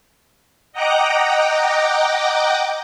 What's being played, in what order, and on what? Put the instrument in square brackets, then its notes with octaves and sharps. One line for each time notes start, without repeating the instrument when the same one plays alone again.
[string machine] D#5 F#5 G5 A#5 D6